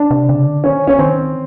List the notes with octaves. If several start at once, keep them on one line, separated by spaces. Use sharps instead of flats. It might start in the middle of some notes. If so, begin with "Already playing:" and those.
Already playing: D4
C3
C#3
D3
D#3 C#4
C#4
D#3 C4